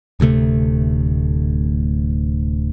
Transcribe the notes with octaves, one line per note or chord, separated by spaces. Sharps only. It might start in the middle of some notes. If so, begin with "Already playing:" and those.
D1 D2 C3 A3